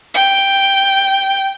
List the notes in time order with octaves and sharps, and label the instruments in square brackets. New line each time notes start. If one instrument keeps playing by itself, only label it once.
[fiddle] G5